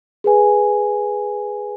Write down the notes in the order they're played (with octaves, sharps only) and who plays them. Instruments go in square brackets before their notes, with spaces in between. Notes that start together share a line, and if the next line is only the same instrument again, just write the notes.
[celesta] G#4 B4 G#5